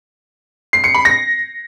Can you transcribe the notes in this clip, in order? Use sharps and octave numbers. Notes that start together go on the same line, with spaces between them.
C7
C#7
B5
A#6